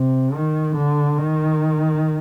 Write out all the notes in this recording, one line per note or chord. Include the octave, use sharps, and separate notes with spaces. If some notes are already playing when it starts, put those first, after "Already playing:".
Already playing: C3
D#3
D3
D#3